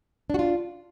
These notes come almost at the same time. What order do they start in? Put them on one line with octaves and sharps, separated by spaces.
D4 F#4 F4